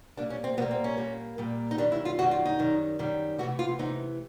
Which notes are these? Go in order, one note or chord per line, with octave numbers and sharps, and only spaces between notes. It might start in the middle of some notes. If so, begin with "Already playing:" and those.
A#2 G3 A#3 D4
C#4
C4
A#2 G3 A#3 B3
C4
C#4
A#2 G3 A#3
A#2 G3 A#3
D#4
F#2 D#3 G3 D4
E4
F4
F#2 D#3 G3 F#4
F4
D#4
F#2 D#3 G3
F#2 D#3 G3
C3 E3 A3 F#4
F4
C3 E3 A3 D#4